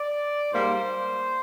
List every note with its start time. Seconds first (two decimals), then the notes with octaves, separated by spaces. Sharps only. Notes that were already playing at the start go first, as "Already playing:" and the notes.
Already playing: D5
0.53 G#2 G3 A#3 C5